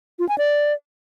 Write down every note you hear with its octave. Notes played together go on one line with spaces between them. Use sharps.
F4
G#5
D5